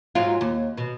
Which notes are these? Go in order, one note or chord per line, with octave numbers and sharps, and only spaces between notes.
G#2 F#3 F4
D#2
B2